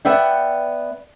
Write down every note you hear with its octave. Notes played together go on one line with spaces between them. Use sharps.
B3 D5 E5 F#5 G5